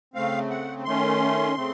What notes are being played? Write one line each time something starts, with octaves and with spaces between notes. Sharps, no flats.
C#3 A3 C4 F5
F#5
D#3 A3 C#4 C6
C#3 A3 C4